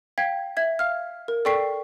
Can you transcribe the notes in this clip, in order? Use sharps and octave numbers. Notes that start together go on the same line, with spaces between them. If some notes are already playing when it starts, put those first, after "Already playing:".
F5 G5 G#6 B6
E5 G#6
F5 F6
A#4
A4 D5 G5 C#6 B6 C7